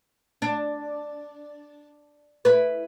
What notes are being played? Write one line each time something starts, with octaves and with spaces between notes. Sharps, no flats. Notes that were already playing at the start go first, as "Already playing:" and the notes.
D4
E4 B4